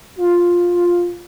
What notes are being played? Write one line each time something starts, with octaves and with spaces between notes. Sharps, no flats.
F4